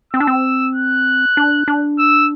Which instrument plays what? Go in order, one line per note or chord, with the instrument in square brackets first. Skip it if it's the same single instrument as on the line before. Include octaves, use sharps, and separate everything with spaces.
[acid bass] C4 [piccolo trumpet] E6
[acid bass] D4
C4
[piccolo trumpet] F#6
[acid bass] D4
D4
[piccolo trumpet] E6